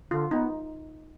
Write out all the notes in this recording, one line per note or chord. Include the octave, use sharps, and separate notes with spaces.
D3 F4
B3 D#4